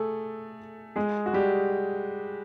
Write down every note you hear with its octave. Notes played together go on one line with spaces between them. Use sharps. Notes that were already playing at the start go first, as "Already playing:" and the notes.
Already playing: A3 G#4 A4
G#3 G#4
F#4
G3 G4